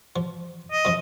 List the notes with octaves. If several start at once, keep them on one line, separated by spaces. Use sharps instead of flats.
F3
D#5
F#2 F3